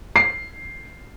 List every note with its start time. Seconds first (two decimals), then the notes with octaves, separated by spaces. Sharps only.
0.16 C7